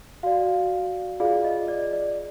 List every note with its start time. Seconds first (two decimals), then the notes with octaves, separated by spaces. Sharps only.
0.23 F#4 D5 F5
1.20 F4 G#4 D5 F5
1.44 D#5
1.68 D5
1.93 D5